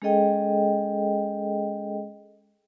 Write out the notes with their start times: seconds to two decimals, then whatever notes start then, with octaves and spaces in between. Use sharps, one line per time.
0.02 G#3 C#4 G#4 A4 D#5 G5